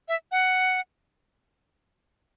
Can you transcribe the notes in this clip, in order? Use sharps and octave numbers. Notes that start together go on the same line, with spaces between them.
E5
F#5